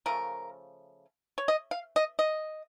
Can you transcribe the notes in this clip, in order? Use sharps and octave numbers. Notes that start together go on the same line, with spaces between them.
C#3 F3 A3 A#4
C#5
D#5
F5
D#5
D#5